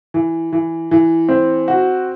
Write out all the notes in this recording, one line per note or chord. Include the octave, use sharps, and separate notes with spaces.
E3
E3
E3
C4
F#4